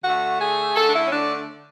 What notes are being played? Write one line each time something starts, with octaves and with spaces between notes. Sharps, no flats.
D3 A3 F#4
G#4
D3 A3 A4
D4
E4
C#4
D4